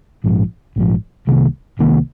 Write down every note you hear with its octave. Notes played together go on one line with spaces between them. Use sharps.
A#1 G#2 F3
A#1 G#2 F3
C2 C3 D#3 A#3
C2 C3 D#3 A#3